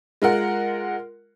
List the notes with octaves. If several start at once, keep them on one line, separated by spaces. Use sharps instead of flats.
G#3 F4 A#4 F#5